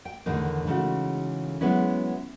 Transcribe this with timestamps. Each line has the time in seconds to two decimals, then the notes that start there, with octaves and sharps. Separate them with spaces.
0.05 G5
0.26 E2 A2 D3 D#3 D#4
0.67 C#3 E3 G#3 A3 D#4 F#4
1.61 F#3 G#3 B3 C#4 E4